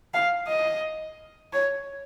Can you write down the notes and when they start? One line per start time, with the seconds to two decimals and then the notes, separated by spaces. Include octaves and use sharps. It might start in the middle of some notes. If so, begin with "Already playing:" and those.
0.14 F5
0.48 D#5
1.53 C#5